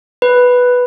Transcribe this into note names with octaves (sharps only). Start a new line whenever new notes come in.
B4